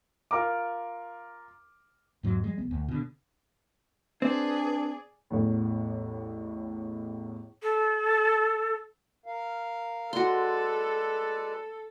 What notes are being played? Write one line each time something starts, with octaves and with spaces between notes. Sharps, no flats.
F4 A#4 A#5 D6
E2 G#2 F#3
F3 G3 G#3
C2 B3
D2
B2 D3
C4 D4 G#4 B4 D5
A1 E2 A2
A4
A#4 F5
G#3 F#4 A4 B4 D5 C6